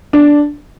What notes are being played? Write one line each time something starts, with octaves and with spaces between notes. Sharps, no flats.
D4